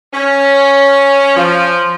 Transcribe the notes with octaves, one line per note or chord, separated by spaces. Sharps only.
C#4
F3